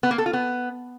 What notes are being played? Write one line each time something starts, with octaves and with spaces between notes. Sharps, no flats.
B3
A#3
A4
F4
B3